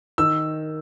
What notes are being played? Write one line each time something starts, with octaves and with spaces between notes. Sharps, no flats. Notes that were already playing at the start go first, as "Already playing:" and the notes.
D#3 E6